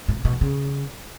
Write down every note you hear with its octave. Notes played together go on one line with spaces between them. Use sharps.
A2
C3
B2
E2
C#3